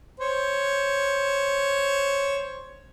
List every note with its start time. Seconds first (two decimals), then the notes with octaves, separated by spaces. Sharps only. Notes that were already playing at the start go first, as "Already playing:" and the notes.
0.20 C5 C#5